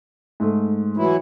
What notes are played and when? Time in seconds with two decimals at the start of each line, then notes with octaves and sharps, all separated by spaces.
0.40 G#2 A3
0.97 E3 F#3 E4